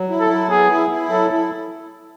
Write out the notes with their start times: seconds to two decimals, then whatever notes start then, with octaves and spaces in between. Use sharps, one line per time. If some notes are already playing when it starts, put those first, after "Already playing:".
Already playing: F#3
0.10 E4
0.20 A4
0.30 F#3
0.50 B3 G#4
0.70 E4
0.90 E4
1.10 F#3 A4
1.31 E4